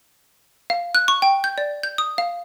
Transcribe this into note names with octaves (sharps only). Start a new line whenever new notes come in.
F5
F#6
C#6
G5
G6
D5
G6
D#6
F5